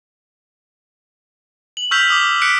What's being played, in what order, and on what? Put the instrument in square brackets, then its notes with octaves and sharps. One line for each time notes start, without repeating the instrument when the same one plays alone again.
[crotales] F#7
C#6 E6 F6 G6 B6 F7
D6 D#6
E6 F#6 B6 C#7 D7